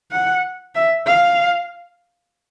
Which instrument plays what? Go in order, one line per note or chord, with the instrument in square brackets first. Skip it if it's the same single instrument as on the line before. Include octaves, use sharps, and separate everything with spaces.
[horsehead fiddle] F#5
E5
F5